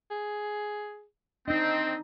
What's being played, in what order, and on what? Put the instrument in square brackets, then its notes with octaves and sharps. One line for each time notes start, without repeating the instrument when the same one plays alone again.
[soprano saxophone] G#4
[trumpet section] C4 [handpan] D4 D#4 [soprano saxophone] D#5